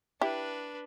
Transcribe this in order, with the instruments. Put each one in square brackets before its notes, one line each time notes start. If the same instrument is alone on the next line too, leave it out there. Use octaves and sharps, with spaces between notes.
[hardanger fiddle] D4 B4 [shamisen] E4 G4